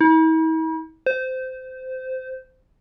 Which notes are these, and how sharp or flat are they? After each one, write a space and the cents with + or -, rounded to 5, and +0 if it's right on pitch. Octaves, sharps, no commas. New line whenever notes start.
E4 -45
C5 -20